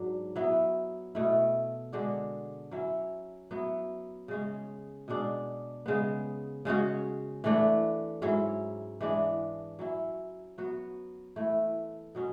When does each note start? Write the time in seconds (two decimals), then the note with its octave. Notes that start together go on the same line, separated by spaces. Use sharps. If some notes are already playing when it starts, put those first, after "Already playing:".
Already playing: G#2 F#3 D4
0.36 F#3 B3 E4
1.15 B2 A3 E4
1.93 D3 G#3 D4 F#4
2.71 F#3 C#4 E4
3.51 F#3 B3 E4
4.28 C#3 G#3 C#4
5.08 B2 G#3 D4
5.86 C#3 G#3 B3
6.65 C#3 G#3 C#4 F#4
7.44 E3 A3 D4
8.22 G#2 F#3 C#4 E4
9.01 E3 G#3 D4
9.79 F#3 C#4 E4
10.58 F#3 B3 F#4
11.36 E3 A3 E4
12.15 B2 F#3 C#4